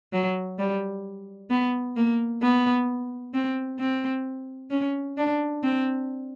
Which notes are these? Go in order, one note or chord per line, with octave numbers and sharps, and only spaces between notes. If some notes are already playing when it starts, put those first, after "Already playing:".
F#3
G3
B3
A#3
B3
C4
C4
C#4
D4
C4